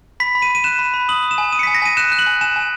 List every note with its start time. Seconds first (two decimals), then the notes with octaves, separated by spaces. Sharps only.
0.20 B5 B6
0.35 B5
0.42 D#7
0.49 B5
0.55 D#7
0.64 F#6 E7
0.79 B5
0.94 B5
1.09 D#6 F#7
1.23 D#6
1.31 E7
1.38 G#5
1.52 D#6 D#7
1.59 C#7
1.63 B6
1.67 G#5
1.74 A#6
1.82 G#5 D#7
1.97 F#6 E7
2.12 F#6
2.19 F#7
2.27 G#5
2.41 G#5 E7
2.56 G#5